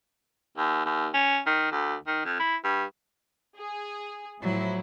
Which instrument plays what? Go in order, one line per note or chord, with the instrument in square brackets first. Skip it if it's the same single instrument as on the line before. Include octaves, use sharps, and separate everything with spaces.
[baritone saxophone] D#2
D#2
C#4
D#3
D2
D#3
F2
E4
G2
[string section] G#4
[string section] A2 F3 E4 [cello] F#3